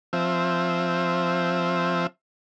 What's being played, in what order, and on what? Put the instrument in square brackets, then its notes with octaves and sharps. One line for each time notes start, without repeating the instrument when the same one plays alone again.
[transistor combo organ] F3 C4 E5